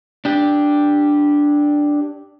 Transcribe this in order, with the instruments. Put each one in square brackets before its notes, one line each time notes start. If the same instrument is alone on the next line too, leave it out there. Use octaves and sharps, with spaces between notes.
[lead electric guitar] D4 G4